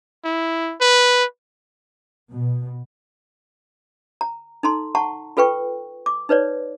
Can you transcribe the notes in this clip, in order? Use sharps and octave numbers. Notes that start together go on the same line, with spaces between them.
E4
B4
B2
A#5
D#4 A4 A#5 C6
F#5 A5 A#5 C#6
F4 A4 B4 G5 C#6
D6
D#4 B4 C#5 D5